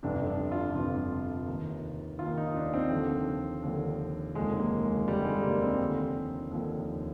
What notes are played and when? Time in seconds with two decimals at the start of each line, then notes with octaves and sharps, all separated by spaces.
0.03 G1 F2 C3 D4
0.26 D4
0.51 F4
0.75 G1 F2 C3 F4
1.47 D#2 D#3
2.19 D#2 D#3 F4
2.37 D#4
2.56 D4
2.73 C4
2.91 D#2 D3 F3
3.63 D#2 D3 F3
4.35 F1 D#2 D3 F3 G#3
4.60 A#3
4.84 G#3
5.08 F1 D#2 D3 F3 G3
5.25 G#3
5.43 A#3
5.61 C4
5.80 D#2 D3 F3
6.51 D#2 D3 F3